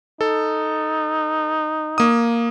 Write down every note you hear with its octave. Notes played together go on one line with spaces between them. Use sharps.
D#4 A4
A#3 D#6